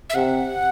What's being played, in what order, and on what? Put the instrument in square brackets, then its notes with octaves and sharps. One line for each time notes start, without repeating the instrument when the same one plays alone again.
[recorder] E5
[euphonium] C3 [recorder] F#5